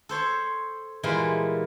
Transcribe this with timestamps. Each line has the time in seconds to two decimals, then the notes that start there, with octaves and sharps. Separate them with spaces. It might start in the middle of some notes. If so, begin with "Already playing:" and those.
0.09 A4 C5 C#5 A5
1.03 A#2 E3 G3 G#3 A#3